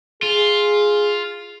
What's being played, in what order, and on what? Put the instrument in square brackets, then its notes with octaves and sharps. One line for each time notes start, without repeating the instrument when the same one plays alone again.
[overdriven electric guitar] F4 [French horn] G#4